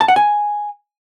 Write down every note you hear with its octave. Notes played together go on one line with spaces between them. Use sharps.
A5
F#5
G#5